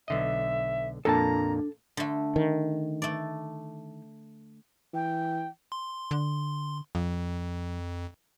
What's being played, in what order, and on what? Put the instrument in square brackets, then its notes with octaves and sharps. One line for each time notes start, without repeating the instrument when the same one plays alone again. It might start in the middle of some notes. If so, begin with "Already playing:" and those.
[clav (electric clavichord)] B1 D3 D#5 [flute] E5
[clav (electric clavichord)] F2 A#2 A#3 [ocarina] D4 [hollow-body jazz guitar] A4 A5 [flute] A#5
[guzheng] D3 A3
[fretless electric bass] D#3
[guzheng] A3 D5
[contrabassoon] E3 [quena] G5
[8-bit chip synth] C6
[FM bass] D3
[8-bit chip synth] F2 [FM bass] F3